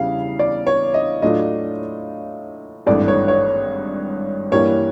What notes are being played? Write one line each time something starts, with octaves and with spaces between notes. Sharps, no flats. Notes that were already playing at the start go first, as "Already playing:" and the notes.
Already playing: E2 C#3 E3 G3 F5
D5
C#5
D#5
A2 F#3 A3 D4 F4 D#5
G#1 G2 E3 A3 D4 D5
C#5
C#5
G2 E3 G3 A#3 C#5